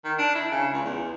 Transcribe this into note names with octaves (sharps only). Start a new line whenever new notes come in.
D#3
D4
E4
C#3
C#2
E2